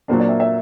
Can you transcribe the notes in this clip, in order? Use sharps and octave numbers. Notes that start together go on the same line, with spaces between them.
A#2 F#3 A#3 D4 C5
D5
E5
E5